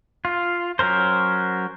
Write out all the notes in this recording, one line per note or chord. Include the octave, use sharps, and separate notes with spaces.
F4
F#3 C#4 A#4 C5